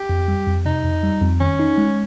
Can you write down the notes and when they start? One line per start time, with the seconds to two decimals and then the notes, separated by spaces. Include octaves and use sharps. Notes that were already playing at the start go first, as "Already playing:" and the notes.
Already playing: G4
0.09 F2
0.28 G3
0.47 F2
0.65 C3 D#4
0.84 F2
1.03 G3
1.22 F2
1.40 D#3 C#4
1.59 D#4
1.78 G#3